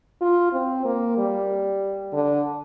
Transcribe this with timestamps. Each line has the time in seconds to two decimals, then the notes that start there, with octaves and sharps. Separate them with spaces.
0.21 F4
0.52 C4
0.85 A#3
1.17 G3
2.13 D3